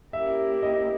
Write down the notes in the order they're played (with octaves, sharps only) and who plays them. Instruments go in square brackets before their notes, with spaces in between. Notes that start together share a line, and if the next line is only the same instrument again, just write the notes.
[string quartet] A#3 C#4 E4 G4 A#4 [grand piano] E5
[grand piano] D#5